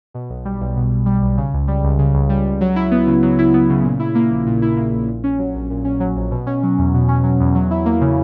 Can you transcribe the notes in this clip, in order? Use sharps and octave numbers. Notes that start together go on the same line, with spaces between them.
B2
B1
G3
B1
B2
B1
G3
B1
C#3
C#2
G3
C#2
C#3
C#2
G3
C#2
F#3
E4
B3
C#3
F#3
E4
B3
C#3
A#2
E4
A#3
A#1
A#2
E4
A#3
A#1
A#2
C#4
F#3
A#1
A#2
C#4
F#3
A#1
B2
C#4
F#3
E2
B2
C#4
F#3
E2
F#3
E4
A#3
C#3